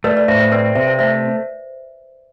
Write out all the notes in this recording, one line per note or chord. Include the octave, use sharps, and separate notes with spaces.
A3 B4 D5
B4 D5
A2 C5 E5
C5 E5
C4 B4 D5
C3 C5 E5
C5 E5
A3 C5 E5